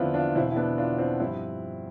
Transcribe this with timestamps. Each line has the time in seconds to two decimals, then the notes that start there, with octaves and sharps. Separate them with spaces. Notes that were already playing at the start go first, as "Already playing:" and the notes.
Already playing: E2 D3 F3 B3 C4 D4 E4 F4
0.14 D4 F4
0.35 E2 B2 C4 E4
0.52 E4
0.56 B3 D4
0.78 D4 F4
0.98 C4 E4
1.20 G2 F3 C4 E4